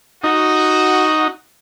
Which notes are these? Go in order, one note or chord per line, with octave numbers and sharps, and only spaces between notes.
D#4 F#4